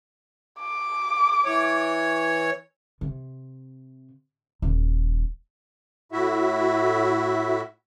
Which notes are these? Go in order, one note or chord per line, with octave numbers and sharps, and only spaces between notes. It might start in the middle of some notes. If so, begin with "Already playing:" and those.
D6
E3 C#5
C3
D#1
A2 E4 F#4 E5